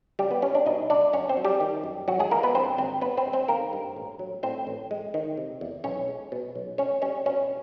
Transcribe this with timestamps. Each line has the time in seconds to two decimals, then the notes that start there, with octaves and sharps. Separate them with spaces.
0.19 C#2 G3 G4
0.31 B3 B4
0.42 G3 C#4 C#5
0.54 D4 D5
0.66 B2 D#4 D#5
0.90 C#2 D4 D5
1.13 F#2 C#4 C#5
1.29 C4 C5
1.37 F#3
1.45 G3 G4
1.60 D#3
1.84 F#2
2.08 G#1 F#3 F#4
2.19 G#3 G#4
2.31 E3 A#3 A#4
2.43 B3 B4
2.55 G2 C4 C5
2.78 G#1 C4 C5
3.02 G2 B3 B4
3.17 C4 C5
3.26 G#3
3.33 C4 C5
3.48 D#3 A#3 A#4
3.73 G2
3.96 A1
4.19 F#3
4.43 A2 C4 C5
4.67 A1
4.91 G#3
5.14 D#3
5.37 C3
5.61 E2
5.84 B1 C#4 C#5
6.08 G#3
6.32 B2
6.55 B1
6.78 C#2 C#4 C#5
7.02 G3 C#4 C#5
7.25 B2 C#4 C#5